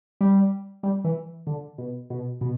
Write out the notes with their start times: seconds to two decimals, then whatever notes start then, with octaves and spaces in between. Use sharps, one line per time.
0.21 G3
0.83 G3
1.04 E3
1.47 D3
1.78 B2
2.10 B2
2.41 B2